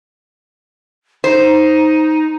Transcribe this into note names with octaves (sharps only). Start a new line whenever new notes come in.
D#4 C5